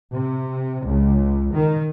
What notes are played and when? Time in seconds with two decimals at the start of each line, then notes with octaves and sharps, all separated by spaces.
0.13 C3
0.85 C#2
1.53 D#3